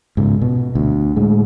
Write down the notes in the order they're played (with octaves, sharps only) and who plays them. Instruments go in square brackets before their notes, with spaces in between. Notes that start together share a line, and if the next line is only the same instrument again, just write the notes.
[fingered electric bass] G#2 C#3
B2
D2
A2 G#3